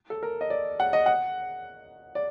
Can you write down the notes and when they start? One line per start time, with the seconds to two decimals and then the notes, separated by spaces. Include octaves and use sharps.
0.10 A4
0.23 A#4
0.41 D#5
0.50 D5
0.80 F#5
0.93 D#5
1.06 F#5
2.15 D5